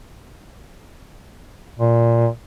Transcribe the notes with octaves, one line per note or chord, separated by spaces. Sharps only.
A#2